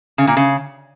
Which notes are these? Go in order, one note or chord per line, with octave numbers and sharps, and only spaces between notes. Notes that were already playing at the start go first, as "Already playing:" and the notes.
C#3
A#2
C#3